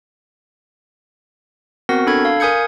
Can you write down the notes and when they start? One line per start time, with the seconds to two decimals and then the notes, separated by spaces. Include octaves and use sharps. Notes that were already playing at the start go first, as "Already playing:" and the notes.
1.89 B3 C4 F#4 A#4 F#5 A#6
2.06 D4 A4 B5 G#6
2.25 F5
2.40 A#4 G#5 D#6 G6 G#6 C#7